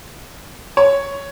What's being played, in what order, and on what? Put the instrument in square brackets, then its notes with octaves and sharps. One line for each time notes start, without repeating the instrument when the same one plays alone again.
[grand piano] C#5